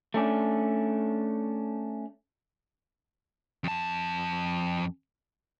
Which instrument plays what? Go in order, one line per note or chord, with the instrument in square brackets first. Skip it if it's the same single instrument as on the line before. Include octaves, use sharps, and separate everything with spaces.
[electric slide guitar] A3 C#4 D4
[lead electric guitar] F2 A5